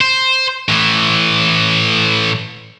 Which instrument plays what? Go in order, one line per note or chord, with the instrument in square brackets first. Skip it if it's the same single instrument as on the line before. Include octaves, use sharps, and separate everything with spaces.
[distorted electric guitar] C5
A2 E3